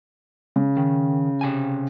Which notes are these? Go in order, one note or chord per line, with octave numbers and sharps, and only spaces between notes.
C#3
D#3
C3 G#5